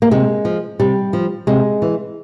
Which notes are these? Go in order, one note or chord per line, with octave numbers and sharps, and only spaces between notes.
A#3
C3 G#3
F3
C3 G3
F3
C3 G#3
E3